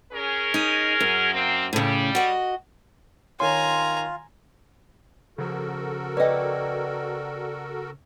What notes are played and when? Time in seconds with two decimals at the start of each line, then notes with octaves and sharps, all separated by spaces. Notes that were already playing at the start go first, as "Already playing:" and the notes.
0.13 C#4 G#4 A#4
0.54 D#4
1.00 F#2
1.33 A#3 C4
1.73 A2 C#3 G3
2.15 F#4 D#5
3.40 D#3 F4 C#5 G#5 A#5 C6
5.38 C#3 F3 F#4 A4 A#4
6.17 B4 D5 D#5 G5